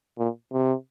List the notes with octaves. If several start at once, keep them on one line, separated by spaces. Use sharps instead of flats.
A#2
C3